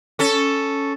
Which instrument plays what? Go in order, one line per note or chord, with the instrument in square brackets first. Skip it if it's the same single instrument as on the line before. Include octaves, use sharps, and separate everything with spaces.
[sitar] C#4 A4